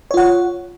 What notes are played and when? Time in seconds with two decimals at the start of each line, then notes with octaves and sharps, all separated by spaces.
0.11 C#5
0.14 F4
0.17 F#5